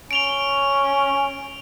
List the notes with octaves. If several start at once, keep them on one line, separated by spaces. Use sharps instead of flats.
C#4 D7 F7 G7